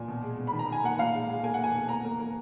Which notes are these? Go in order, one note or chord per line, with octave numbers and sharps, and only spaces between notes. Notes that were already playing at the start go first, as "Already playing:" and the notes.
Already playing: A#2 G#5
B2
G#3
B2
B5
D#3
A#5
D#3 G#5
A#3 F#5
A#2 F5
G#3
G#3
A#3 G#5
F#5
A#3 G#5
B2
A#3 A#5
A#3
A#3